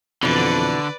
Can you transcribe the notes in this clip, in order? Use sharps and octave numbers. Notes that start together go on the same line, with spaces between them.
F2 B2 D3 E3 B4 D5